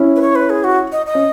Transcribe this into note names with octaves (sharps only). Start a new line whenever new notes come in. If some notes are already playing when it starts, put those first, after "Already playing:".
Already playing: C#4 E4
B4
C#5
B4
G#4
F#4
D#5
D#5
C#4